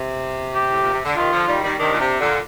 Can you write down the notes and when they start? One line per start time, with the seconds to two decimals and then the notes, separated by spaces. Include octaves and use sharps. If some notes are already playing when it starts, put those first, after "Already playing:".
Already playing: C3
0.54 G4
0.70 A2
0.82 A#2
0.93 C3
1.05 D3
1.16 C3 D#3 F4
1.32 D3 F3
1.47 D#3 G3
1.64 D#3 G3
1.79 C3 D#3 D4
1.92 A#2
2.00 C3
2.20 A#2 D3